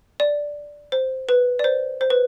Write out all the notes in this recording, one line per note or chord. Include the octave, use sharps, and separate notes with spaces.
D5
C5
B4
D5
C5
C5
B4